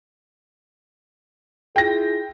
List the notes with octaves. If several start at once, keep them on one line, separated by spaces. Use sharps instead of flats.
E4 F4 G#4 G5 A#6